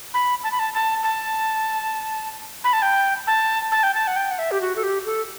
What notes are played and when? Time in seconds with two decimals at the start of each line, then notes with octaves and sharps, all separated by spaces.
0.14 B5
0.44 A5
0.52 B5
0.59 A5
0.74 A5
1.03 A5
2.64 B5
2.73 A5
2.82 G5
3.27 A5
3.72 A5
3.83 G5
3.94 A5
4.07 F#5
4.16 G5
4.31 F#5
4.39 E5
4.51 G4
4.61 F#4
4.76 A4
4.83 G4
5.06 A4